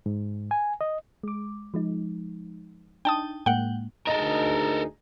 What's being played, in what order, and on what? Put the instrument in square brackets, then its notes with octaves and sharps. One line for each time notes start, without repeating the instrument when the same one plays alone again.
[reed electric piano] G#2
G#5
D#5
[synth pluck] G#3 D6
F3 G#3 D#4
[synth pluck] D4 D#4 [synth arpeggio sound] G5 A5 D#6
[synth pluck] A2 G#3 A#3 [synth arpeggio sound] F#5 G5
[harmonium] D2 G#3 D#4 [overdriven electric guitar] A4 A#4 [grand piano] D#5